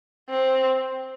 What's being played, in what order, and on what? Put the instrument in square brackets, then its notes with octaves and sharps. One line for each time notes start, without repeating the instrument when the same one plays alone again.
[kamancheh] C4